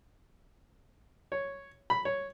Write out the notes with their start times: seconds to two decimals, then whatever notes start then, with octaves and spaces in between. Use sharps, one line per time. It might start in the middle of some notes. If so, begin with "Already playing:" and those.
1.32 C#5
1.90 B5
2.05 C#5